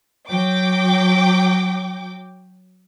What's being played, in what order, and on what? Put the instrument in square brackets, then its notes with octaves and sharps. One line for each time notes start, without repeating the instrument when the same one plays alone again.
[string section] F#3 G5 D6